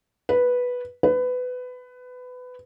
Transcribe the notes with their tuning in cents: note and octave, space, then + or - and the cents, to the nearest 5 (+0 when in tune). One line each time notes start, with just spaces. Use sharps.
B4 -5
B4 +20